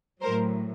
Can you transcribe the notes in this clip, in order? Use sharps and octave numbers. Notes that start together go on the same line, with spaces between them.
A2 F#3 A#4 C5